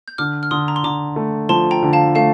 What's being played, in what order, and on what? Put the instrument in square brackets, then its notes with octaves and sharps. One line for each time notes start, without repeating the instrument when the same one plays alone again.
[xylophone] G6
[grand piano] D3 [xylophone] D6 F6
[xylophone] F6
[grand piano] D3 [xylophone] C6 D#6
[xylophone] A#5
C6
[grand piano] D3 [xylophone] A#5 D6
[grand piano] A3
[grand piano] F3 [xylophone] A5 C6
[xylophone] G5 A#5
[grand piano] D3
[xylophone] F5 A5
[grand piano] A3 [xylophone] F5 A5